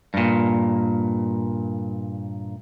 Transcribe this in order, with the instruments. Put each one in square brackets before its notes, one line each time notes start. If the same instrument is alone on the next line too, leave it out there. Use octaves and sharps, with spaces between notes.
[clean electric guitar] G2 A#2